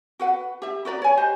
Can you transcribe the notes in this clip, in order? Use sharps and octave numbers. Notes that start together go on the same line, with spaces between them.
F#4 B4 F#5
G4 E5
F#4 B4 D5 A#5
C#5 G#5
G4 B4 C5 D#5